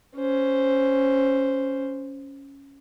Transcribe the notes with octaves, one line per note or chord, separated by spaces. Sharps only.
C#4 C5